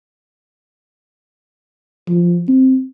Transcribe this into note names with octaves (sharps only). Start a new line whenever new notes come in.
F3
C4